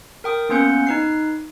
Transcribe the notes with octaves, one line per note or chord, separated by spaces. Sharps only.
A#4 G5 D#6
A#3 B3 C#4 B4 G6 C#7
D#4 B4 C7